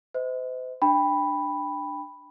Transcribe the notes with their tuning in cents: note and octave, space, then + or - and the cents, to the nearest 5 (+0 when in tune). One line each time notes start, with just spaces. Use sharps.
C5 -40 D#5 +35
D4 +10 G5 +20 B5 +0